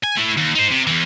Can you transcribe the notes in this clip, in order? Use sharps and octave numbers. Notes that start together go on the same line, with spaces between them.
G#5
A3 E4
D#2
D#4 C5
C3
E2 E3